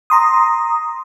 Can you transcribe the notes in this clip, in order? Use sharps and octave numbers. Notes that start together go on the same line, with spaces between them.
A#5 C6 D#6